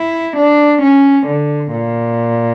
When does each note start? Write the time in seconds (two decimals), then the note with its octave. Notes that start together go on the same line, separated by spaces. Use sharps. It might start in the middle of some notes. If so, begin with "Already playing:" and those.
Already playing: E4
0.37 D4
0.82 C#4
1.27 D3
1.72 A#2